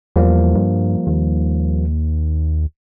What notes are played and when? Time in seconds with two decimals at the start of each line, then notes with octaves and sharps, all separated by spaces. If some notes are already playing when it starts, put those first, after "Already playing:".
0.16 E2 F3 G3 A#3
0.55 G2
1.06 D#2